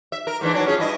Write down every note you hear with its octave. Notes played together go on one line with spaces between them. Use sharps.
E5
A#4
G#2 E3 D4
E3 F#3 D4
C#4 F4 G#4
G2 E4 D#5